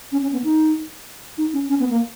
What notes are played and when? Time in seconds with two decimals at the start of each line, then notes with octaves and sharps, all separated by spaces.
0.12 C#4
0.22 C#4
0.33 B3
0.44 D#4
1.38 D#4
1.53 C#4
1.69 C#4
1.80 B3
1.90 A#3